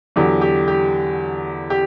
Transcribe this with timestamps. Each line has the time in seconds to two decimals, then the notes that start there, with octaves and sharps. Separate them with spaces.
0.16 E2 D3 F#3 G4
0.41 G4
0.68 G4
1.70 G4